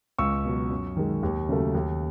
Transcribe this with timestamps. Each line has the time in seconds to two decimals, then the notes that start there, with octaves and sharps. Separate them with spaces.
0.19 C#2 C#6 E6
0.45 B2 F#3
0.70 F#2
0.97 D#3 G#3
1.23 D#2
1.49 C#3 F#3 A3
1.74 D#2